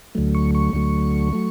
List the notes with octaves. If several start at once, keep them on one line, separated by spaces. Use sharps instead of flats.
D2 D3 F#3 A3
C#6
C#6
D2 D3 F#3 A3
F#3 A3